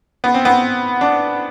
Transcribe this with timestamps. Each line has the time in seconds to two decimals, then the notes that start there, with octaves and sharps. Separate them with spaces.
0.24 B3
0.34 C4
0.45 B3
1.01 D4